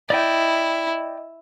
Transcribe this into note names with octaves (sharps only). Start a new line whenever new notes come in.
E4 D5 D#5 G5